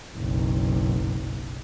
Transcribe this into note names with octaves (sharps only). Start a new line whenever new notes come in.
F#1 B1